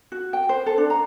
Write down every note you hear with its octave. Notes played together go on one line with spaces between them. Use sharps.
F#4
G5
C5
A4
D4
A#5